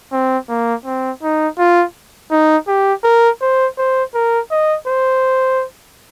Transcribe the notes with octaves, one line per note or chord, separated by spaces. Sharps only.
C4
A#3
C4
D#4
F4
D#4
G4
A#4
C5
C5
A#4
D#5
C5